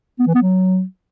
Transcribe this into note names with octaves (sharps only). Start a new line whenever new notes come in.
B3
E3
B3
F#3